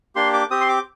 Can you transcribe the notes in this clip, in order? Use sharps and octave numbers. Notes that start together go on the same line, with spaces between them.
A#3 D4 G4 C6
D6
C4 G4 D#6
C6
D6